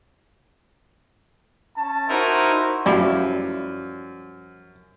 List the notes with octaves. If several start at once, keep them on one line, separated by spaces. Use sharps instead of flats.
C#4 A5
D#4 E4 F#4 A#4 C5
F#2 F3 G3 E4